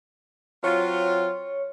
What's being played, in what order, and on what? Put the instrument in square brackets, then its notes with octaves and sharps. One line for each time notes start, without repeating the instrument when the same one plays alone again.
[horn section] F#3 C4 F4 [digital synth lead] C#5